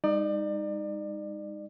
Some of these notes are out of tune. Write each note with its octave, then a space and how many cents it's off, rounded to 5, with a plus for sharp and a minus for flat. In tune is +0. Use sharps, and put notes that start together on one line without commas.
G#3 -40 D#4 +0 D5 +30